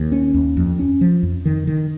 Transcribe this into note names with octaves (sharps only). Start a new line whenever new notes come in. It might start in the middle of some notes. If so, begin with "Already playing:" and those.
Already playing: D#2
C#4
D#2
F2
C#4
F3
F2
D#3
D#3